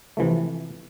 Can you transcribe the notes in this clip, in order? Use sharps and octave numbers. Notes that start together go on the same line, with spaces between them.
C3 E3 F3 A3